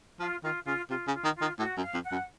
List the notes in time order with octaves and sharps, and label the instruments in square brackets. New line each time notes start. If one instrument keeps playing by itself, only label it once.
[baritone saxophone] F3 [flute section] F4
[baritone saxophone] D#3 [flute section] F4
[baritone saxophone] C#3 [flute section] F4
[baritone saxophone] C3 [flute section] F4
[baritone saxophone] C#3
[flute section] F4
[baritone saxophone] D#3
[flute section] F4
[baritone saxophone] D#3
[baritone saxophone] A2 [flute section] F#4
[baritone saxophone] F#2
[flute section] F5
[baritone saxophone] F2
[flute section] F#5
[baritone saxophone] F#2